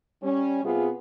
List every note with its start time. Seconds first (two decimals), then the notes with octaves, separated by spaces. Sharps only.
0.22 G3 C#4
0.64 C3 B3 F4 G#4